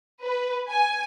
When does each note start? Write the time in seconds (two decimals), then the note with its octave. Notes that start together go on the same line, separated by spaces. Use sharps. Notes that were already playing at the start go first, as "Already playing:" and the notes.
0.21 B4
0.68 G#5